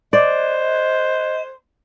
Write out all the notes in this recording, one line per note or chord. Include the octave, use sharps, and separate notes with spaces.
C5 D5 D#5